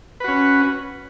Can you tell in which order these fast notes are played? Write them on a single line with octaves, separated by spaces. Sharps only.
B4 F#4 C#4